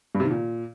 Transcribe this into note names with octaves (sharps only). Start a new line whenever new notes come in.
G2
C3
D#3
A#2